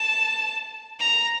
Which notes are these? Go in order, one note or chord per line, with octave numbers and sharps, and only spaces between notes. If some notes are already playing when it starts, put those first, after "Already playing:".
Already playing: A5
A#5